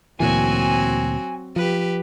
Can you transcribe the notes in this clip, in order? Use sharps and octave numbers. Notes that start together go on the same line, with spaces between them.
D2 A#2 E3 F#3 C4 F#4 G#5
F3 G4 B4